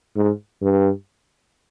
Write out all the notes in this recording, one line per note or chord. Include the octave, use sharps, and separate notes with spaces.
G#2
G2